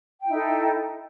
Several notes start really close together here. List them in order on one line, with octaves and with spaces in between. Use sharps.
G5 E4 D#4 A4